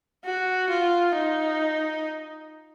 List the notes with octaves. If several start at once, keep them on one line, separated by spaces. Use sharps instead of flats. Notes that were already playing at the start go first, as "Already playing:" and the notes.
F#4
F4
D#4